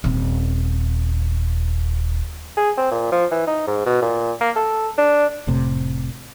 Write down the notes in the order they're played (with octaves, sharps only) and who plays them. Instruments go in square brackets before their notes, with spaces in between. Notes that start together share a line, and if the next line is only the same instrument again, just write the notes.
[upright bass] D#1 C4
[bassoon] G#4
C4
A#2
F3
E3
D#4
G#2
B2
A#2
A#3
A4
D4
[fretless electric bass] F1 A2 C3